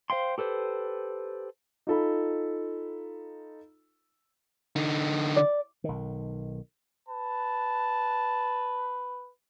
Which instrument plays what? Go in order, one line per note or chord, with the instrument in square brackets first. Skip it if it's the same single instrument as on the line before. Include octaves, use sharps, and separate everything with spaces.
[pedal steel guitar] C5 F5 G5 C6
G4 A4 B4 C5
[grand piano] D#4 F4 A4 B5
[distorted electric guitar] D3 D#4
[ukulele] D5
[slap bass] B1 D#3
[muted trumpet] B4 [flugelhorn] A5